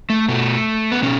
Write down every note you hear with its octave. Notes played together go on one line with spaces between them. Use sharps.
A3
B2 A3
B3
B2 C#4